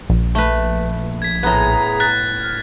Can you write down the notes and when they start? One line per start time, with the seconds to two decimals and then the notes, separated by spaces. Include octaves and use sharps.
0.10 A#1
0.35 A3 B4
1.22 G#6 B6
1.43 A2 B3 G#4 A#5
2.00 F#6 A6 B6
2.40 F6